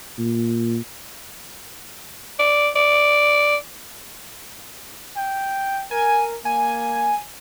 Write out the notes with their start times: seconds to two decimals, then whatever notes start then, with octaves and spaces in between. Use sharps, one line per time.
0.18 A#2
2.39 D5
2.76 D5
5.17 G5
5.91 A#4 G#5
6.45 A#3 G#5